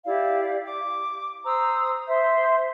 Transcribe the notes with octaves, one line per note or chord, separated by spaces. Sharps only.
E4 G4 D5 F5
D6
C5 A#5 D#6 E6
C5 E5